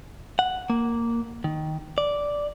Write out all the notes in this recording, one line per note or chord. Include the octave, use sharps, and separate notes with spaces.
F#5
A#3
D#3
D5